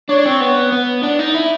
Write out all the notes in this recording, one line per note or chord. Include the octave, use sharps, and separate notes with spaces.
D4 C#5
C4
B3
B3
D4
D#4
E4